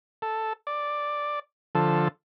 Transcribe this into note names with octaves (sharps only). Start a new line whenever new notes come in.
A4
D5
D3 F3 A4